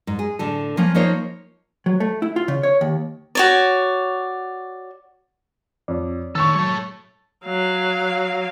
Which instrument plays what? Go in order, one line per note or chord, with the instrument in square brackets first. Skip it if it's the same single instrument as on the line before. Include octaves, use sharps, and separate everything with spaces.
[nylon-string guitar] G#2
G#4
A2 D3 A4
F3 A#3 C#4
F3 A#3 D#4 C5 C#5
[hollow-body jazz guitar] F#3
A3
E4
F4
C#3
C#5
D#2
[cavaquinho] F#4 C#5 D5
[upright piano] F2 [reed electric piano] C#5 D5
[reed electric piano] D#3 [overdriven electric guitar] A4 C#5 [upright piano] C#6 E6
[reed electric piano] F#3 [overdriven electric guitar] A4 C#5
[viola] F#3 F5